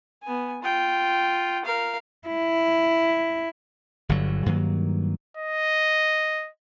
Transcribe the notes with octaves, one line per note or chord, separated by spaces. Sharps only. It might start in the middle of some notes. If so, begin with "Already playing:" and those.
B3 G#5
F4 G5
A#4 F5
E4
G1 G2 D3 F#3
G2 D#3 F#3 A#3
D#5